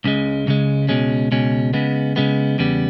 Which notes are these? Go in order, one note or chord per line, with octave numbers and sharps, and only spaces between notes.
C#2 C#3 G#3
C#2 C#3 G#3
C#2 B2 G#3 C#4
C#2 B2 G#3 C#4
C#3 G#3 B3
C#3 G#3 B3
E2 C#3 G3 B3